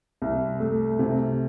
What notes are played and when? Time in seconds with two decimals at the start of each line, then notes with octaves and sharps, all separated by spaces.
0.22 C2
0.60 A3
0.99 C3